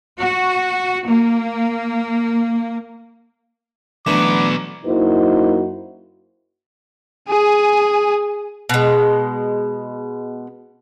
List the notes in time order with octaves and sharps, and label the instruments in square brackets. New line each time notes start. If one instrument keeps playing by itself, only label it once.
[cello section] F#4
A#3
[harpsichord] D2 E3 D4 [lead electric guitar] F#3 B3 [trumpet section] A#5 D6
[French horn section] F#2 A#3 D#4 E4 F#4 C5
[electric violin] G#4 G#5
[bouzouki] B2 G#3